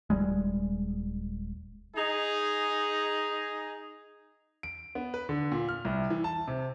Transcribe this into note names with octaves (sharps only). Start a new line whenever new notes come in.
D#1 D#2 G3 G#3
D#4 G#4
D7
B3
B4
D3
A#2
F6
C2
E3
A5
C3